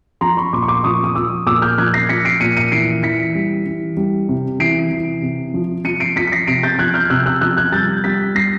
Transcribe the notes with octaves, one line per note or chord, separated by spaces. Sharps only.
F3 A#5 C6
B5 C#6
A#2 C6 D6
C#6
C6 D6
F3 C#6 D#6
D#6
F3 D6 E6
A#2 D6 E6
F6 G6
F3 F#6 G#6
A#6 C7
F3 B6 C#7
C7 D7
A#2 C#7 D#7
C#7 D#7
E3 C7 D7
E3 B6 C#7
G3
E3
G3
C3
E3 C7 D7
E3
C3
F3
F3 C#7 D#7
C7 D7
F3 B6 C#7
B6
A#6 C7
C3 C7 D7
G6 A6
F3 F#6 G#6
F6 G6
C3 E6 F#6
E6 F#6
F3 E6 F#6
F#6 G#6
G3 G6 A6
G3 A6 B6
G3 A#6 C7